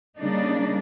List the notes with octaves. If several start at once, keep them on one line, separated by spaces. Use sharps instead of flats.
C#3 G3 A#3 D4 D#4